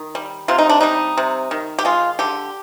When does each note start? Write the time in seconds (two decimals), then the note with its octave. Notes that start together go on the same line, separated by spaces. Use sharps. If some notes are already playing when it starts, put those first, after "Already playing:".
Already playing: D#3
0.15 G3
0.48 C3 F4
0.58 D#4
0.69 D4
0.81 G3 D#4
1.17 C3
1.51 D#3
1.79 G4
1.85 G#3 F4
2.19 D3 G4